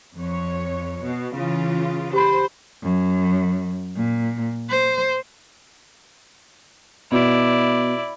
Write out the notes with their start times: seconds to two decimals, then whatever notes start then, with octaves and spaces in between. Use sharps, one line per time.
0.15 F2 C#5
1.03 B2
1.34 C#3 E3 F4
2.13 G4 C5 B5
2.82 F#2
3.96 A#2
4.69 C5
7.11 B2 E4 D5